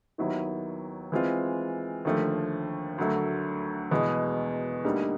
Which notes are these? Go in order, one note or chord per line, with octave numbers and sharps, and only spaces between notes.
D#2 D#3 F#3 B3 E4
E3 G#3 C4 F4
D#2 D3 F3 A3
D2 D3 F#3 A3
E2 B2 G#3 B3
D2 D3 G3 A#3 D#4